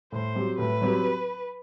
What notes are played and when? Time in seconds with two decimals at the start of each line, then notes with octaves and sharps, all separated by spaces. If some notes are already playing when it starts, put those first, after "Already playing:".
0.12 A2 C5
0.35 F#3 C4 G4
0.58 A2 B4
0.82 F#3 C4 G4